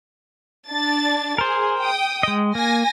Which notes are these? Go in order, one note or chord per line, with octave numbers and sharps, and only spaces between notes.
D4 A6
G#4 A#4 C5
G5 D#6
G#3 D#5
A#3 G#5 A#6